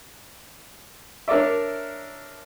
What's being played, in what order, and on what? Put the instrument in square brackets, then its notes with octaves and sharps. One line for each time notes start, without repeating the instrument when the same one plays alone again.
[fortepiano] D4 A#4 C#5 D5 E5